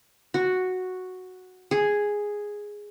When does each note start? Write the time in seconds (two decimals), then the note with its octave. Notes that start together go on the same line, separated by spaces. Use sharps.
0.34 F#4
1.71 G#4